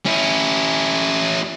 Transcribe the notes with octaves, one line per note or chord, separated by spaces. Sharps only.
C#4 E4